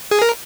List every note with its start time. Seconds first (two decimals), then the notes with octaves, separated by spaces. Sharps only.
0.11 G#4
0.22 A#4